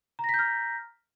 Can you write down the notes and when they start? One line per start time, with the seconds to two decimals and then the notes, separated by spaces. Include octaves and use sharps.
0.19 A#5
0.24 A#6
0.29 B6
0.34 G6
0.39 F6